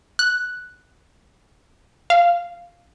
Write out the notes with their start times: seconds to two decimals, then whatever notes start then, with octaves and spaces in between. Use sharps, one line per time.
0.19 F#6
2.10 F5